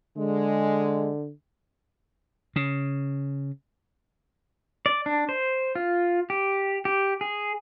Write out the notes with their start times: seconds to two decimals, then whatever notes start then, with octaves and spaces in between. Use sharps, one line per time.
0.17 D3 G#3
2.56 C#3
4.86 D5
5.06 D4
5.29 C5
5.75 F4
6.30 G4
6.85 G4
7.21 G#4